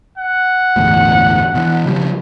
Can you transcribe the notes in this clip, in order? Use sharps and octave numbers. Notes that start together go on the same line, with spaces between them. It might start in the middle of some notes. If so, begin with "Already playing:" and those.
F#5
G1 E2 A2
B2 E3
C#3 F3 G3